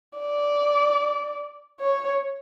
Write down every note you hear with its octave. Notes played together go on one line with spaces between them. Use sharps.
D5
C#5